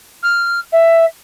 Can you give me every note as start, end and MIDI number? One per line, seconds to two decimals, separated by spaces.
0.23 0.59 89
0.72 1.05 76